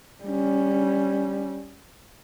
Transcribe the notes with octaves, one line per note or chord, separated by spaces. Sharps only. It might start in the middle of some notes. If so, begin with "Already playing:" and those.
G3 C#4